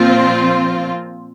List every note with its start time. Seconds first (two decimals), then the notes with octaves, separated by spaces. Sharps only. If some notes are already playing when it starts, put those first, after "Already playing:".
Already playing: A#2 F3 C4 F4